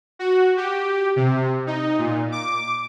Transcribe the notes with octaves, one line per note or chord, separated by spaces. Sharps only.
F#4
G4
C3
D#4
A#2
D6